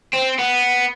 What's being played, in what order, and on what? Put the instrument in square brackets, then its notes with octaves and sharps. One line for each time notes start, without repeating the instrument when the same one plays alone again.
[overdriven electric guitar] C4
B3